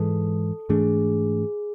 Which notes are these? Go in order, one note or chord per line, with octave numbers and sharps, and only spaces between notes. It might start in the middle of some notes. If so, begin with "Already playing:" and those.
Already playing: G#2 E3 G#3 A4
G#2 E3 A3 D4 G#4